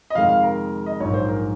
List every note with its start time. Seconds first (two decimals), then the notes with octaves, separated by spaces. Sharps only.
0.10 D#5
0.15 F2 C3 D#3 G#3 F5
0.29 F5
0.43 A#4
0.86 D#5
0.99 A#1 G#2 F#3 C#5
1.14 C5
1.28 A#4